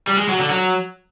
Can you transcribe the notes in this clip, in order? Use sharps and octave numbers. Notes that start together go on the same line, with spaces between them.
G3
G#3
F#3
D3
F#3